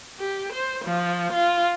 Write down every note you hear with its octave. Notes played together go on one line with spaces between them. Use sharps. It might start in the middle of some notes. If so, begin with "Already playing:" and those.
G4
C5
F3
F4